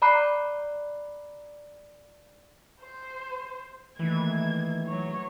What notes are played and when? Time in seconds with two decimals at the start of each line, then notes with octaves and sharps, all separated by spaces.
0.02 D5 A#5 B5 D6 F#6 C7
2.81 C5
3.99 D#3 E3 A3 A#3 G#6
4.87 F#3 C#5